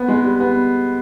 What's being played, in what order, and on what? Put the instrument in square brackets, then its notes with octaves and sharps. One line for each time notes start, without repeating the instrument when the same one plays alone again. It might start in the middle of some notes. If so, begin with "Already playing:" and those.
Already playing: [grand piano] B3
G#3
G3
B3